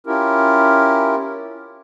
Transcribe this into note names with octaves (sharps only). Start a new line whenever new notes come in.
C#4 E4 F4 G4 A#4